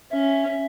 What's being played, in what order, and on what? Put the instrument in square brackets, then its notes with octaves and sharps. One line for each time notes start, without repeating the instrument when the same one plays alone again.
[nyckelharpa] C#4 [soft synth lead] E5